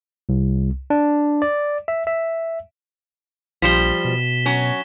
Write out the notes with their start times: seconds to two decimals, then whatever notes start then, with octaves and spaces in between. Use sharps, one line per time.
0.29 C2
0.90 D4
1.42 D5
1.88 E5
2.07 E5
3.62 A#1 F3 G3 B6 E7 G7
4.05 B2
4.46 F#3 C#4